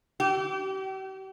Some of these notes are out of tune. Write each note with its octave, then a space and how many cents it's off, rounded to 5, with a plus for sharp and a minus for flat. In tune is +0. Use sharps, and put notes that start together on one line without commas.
G4 -40